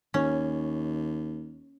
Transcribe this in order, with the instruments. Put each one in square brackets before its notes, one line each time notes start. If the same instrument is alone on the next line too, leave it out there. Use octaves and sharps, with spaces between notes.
[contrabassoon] D#2 [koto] C#4